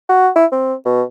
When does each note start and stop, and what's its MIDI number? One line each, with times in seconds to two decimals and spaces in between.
0.09 0.30 66
0.36 0.46 64
0.52 0.74 60
0.86 1.03 47